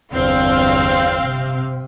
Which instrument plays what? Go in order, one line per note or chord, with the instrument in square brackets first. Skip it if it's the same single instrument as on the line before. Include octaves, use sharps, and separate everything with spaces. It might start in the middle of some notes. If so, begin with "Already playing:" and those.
[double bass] G1 E2 [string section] C4 F5
[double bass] C3